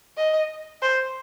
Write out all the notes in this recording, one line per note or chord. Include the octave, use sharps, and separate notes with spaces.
D#5
C5